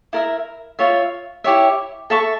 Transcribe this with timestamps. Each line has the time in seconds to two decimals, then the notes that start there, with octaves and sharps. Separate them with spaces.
0.13 E4 A#4 E5
0.79 F4 C#5 E5
1.44 E4 G4 C#5 E5
2.10 A4 E5 A5 C#6